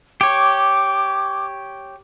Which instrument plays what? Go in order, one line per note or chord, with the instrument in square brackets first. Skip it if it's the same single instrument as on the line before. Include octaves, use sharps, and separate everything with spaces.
[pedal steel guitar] G4 C#5 [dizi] D6